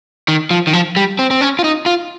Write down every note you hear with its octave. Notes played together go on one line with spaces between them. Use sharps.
D#3
F3
D#3
F3
G3
C4
C4
C#4
F4
D#4
F4